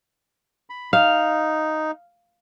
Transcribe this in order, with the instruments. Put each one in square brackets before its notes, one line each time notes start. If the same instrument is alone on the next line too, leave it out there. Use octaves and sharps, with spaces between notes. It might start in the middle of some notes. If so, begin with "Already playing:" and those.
[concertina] B5
[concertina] D#4 [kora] F5